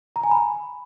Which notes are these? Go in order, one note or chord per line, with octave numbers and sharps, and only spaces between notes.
A#5
G#5
B5